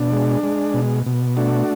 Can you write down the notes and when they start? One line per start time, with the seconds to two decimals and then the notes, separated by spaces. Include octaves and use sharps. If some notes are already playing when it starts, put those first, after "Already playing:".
Already playing: B2 D4
0.12 G#3
0.43 G#3
0.74 B2
1.06 B2
1.37 A3 D4 F#4